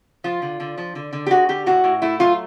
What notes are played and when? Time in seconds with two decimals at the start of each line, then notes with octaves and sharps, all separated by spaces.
0.24 F3 F4
0.42 D3
0.60 D3
0.78 F3
0.95 D3
1.13 D3
1.26 G4
1.31 G#3 F#4
1.49 D3 G4
1.66 A2 F#4
1.84 A2
2.02 A3 E4
2.19 F#3 F4